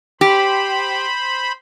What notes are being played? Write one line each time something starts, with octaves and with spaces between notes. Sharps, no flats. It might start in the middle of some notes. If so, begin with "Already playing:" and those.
G4 C5 B5